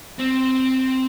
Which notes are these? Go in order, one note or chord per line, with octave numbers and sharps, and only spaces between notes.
C4